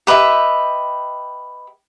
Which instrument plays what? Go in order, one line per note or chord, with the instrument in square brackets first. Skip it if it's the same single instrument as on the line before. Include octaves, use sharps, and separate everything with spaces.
[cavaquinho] G4 B4 D#5 E5